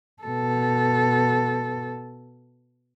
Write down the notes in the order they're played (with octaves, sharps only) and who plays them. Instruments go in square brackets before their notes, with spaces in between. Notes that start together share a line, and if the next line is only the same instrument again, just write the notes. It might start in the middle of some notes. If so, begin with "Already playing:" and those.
[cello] B2 A4